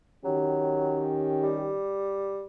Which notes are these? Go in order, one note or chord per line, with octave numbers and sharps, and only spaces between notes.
D#3 F#3 C#4 G4
G3